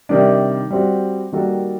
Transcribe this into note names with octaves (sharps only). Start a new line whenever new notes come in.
C3 D#3 G3 D4
G3 C4 F#4
D#3 G3 A#3 F#4 A4